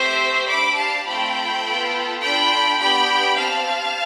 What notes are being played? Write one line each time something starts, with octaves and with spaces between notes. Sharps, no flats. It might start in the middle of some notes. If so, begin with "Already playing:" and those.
Already playing: A3 C4 G4 C5 E5
D4 G4 B5 D6
F5 A5
A3 C4 F4 A4 G5 B5
B3 F4 A4
D4 F4 A4 G5 B5
B3 D4 G4 G5 B5
C4 G4 F5 A5